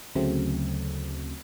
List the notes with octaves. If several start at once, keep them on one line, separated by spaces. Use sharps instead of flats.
D2 C#3 F#3 A3 C4